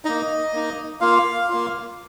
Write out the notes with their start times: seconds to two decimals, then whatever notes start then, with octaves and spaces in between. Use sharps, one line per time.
0.05 A#3 D#4 D#5
0.53 A#3 D#4
1.01 A#3 F4 F5
1.49 A#3 F4